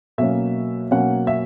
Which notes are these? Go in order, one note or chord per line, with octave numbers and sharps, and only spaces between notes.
B2 F#3 A#3 C#4 E5
B2 F#3 A#3 C#4 F#5
E5